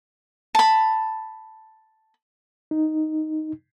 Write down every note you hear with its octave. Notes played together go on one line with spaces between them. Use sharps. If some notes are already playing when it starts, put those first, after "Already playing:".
A5 B5
D#4